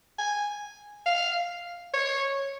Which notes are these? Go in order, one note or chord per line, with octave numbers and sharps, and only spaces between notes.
G#5
F5
C#5